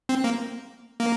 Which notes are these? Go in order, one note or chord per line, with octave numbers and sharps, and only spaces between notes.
C4
A#3
A#3